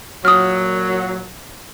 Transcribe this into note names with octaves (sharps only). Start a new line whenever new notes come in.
A#2 F#3 D#6 F6